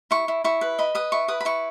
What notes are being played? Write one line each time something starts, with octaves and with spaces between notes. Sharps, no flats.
E4 C#6
E4
E4 C#6
B4
D#5 B5
B4 D#6
E4 C#6
B4 D#6
B5
E4 C#6